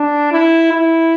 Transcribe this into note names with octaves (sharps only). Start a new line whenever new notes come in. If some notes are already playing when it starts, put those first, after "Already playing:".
Already playing: D4
E4
E4